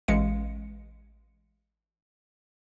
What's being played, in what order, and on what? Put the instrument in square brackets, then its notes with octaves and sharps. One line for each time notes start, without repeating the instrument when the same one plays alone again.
[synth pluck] A1 G#3 F5 C#7